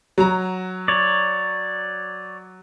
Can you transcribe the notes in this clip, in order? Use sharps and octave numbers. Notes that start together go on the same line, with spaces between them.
F#3 A#5
C#5 D5